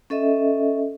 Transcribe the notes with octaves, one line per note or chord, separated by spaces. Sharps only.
C#4 A4 D#5 E5